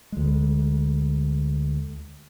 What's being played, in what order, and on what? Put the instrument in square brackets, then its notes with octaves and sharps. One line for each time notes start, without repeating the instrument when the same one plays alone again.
[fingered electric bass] D2 G#3